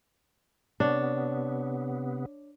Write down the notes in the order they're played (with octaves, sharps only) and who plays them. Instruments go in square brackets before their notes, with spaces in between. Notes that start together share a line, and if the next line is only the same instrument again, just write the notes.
[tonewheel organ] C3 B3 [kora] D4 [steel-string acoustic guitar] C#5